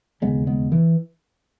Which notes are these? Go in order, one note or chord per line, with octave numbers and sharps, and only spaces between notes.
E1 D#2 C#3 G#3 B3
G#3 B3
E3